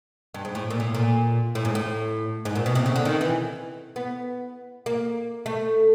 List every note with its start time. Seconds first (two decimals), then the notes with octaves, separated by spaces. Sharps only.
0.34 G2
0.45 G#2
0.55 A2
0.70 A#2
0.80 A2
0.94 A#2
1.55 A2
1.65 G#2
1.75 A2
2.45 G#2
2.56 A#2
2.66 B2
2.75 C3
2.86 C#3
2.96 D3
3.05 D#3
3.21 E3
3.96 B3
4.86 A#3
5.46 A3